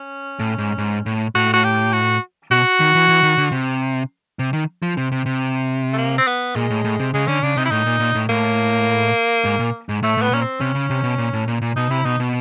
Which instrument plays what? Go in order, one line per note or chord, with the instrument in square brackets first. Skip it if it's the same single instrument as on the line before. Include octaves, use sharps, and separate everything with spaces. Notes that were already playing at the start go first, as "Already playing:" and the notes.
Already playing: [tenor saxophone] C#4
[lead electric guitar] A2
G#2
G#2
A2
[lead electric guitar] A2 [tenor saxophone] F#4
[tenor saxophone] F#4
G4
F#4
[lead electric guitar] B2 [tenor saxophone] F#4
[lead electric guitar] D#3
E3
E3
D#3
D3
C3
C3
D#3
F3
C3
C3
C3
[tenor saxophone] A3
A#3
C4
B3
[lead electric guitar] A#2 [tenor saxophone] G#3
[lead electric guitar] A2
A2
C3
[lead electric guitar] C#3 [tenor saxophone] G#3
[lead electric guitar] D3 [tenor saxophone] C#4
[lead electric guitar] C#3 [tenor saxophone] D4
[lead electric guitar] C3 [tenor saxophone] D#4
[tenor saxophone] E4
[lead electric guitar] A2 [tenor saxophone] D#4
[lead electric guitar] A#2
A#2
A2
[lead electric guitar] A2 [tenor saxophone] A#3
[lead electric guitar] G#2
A#2
G#2
[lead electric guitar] A2 [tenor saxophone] A3
[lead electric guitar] A2 [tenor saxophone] B3
[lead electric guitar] A#2 [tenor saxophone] C#4
[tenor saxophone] C4
[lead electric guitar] C3 [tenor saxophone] C#4
[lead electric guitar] C#3
C3
B2
A#2
A2
A#2
A#2
[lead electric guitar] B2 [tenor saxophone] D#4
[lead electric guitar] C3 [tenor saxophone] E4
[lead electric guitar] B2 [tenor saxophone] D#4
[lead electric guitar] B2